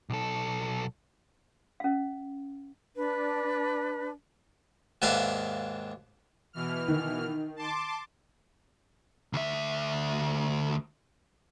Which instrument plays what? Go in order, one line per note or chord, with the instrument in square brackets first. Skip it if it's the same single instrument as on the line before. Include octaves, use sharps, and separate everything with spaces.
[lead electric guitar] B1 A4
[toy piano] C#4 F5
[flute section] D4 [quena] B4
[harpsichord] D#2 G#2 D4 B4 E5 F5
[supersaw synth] B2 E3 F6
[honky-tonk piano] D#3
[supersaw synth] A5 C6 D6
[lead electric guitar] D2 E5